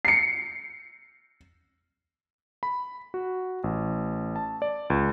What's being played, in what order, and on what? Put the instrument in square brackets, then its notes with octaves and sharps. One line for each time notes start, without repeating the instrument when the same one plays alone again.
[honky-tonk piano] C7 C#7
[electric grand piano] B5
F#4
A1
A5
D5
C#2